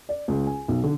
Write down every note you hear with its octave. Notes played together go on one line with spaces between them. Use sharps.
D5
C#2
G#5
B1
D3